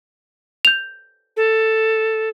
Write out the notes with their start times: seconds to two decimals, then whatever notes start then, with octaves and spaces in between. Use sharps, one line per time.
0.65 G6 F7
1.37 A4